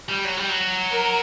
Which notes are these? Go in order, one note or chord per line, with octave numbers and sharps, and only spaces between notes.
G3
F#3
G3
F#3
A#4